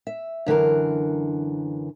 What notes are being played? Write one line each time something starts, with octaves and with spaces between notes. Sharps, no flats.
E5
F#2 D3 E3 A#4